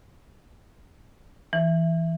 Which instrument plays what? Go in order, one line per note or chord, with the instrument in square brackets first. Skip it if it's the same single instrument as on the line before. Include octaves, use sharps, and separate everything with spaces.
[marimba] E3